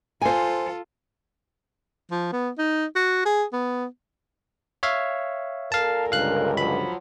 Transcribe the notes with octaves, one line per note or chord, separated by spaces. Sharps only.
F4 A4 C5 G#5
F3
B3
D#4
F#4
G#4
B3
C#5 E5 F5
A#2 A4 A#4 F5 A5
C#2 G2 D3 F5 F#6
F3 F#3 B5